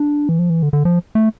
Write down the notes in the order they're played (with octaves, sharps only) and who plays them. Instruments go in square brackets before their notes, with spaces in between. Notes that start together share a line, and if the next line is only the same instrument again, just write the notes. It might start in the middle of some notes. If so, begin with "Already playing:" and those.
Already playing: [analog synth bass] D4
E3
F3
E3
D3
D3
F3
A3